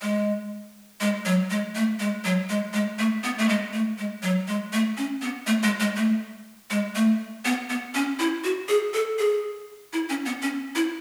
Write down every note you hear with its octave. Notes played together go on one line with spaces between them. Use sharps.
G#3
G#3
F#3
G#3
A3
G#3
F#3
G#3
G#3
A3
B3
A3
G#3
A3
G#3
F#3
G#3
A3
C#4
B3
A3
G#3
G#3
A3
G#3
A3
B3
B3
C#4
E4
F#4
G#4
A4
G#4
E4
C#4
B3
C#4
E4